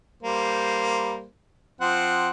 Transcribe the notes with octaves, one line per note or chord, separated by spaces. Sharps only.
G3 A#3 C5
F3 C4 F#5